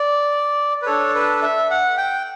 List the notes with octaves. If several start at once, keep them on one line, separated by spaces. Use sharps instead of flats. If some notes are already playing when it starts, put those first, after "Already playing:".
Already playing: D5
B4
D4 A4 C#5
B4
E5
F#5
G5